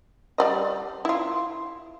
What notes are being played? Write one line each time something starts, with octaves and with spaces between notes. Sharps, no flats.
G3 D5 D#5
E4 F4